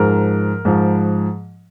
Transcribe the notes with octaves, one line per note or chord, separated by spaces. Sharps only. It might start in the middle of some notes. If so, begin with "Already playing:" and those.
Already playing: G#2 F3 A#4
G#2 F3